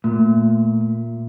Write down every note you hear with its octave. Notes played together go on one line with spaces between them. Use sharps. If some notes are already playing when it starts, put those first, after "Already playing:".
A#2 A3 A#3